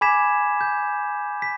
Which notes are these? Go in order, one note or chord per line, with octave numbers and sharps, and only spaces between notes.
G#5 B5 D6 G#6 B6 E7
G6
B6